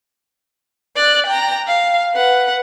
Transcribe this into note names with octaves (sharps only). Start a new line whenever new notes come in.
D5 F#6
G5 A#5
F5
B4 F#5